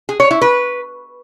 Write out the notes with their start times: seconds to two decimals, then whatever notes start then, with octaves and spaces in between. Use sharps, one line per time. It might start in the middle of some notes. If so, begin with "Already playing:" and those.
0.09 G#4
0.20 C#5
0.31 E4
0.41 B4